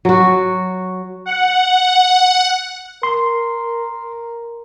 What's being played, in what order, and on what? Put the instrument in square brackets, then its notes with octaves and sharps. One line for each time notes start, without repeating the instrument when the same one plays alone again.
[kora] F#3 F#4
[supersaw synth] F#5
[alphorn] A#4 [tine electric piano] C6